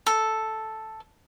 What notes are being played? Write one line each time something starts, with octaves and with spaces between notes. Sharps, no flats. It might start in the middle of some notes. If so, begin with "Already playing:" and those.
A4